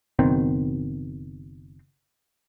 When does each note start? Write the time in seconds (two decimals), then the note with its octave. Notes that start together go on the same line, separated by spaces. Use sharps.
0.19 F#1 B2 D#3 C4